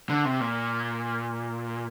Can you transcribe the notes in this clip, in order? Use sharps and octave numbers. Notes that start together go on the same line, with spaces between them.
D3
C3
A#2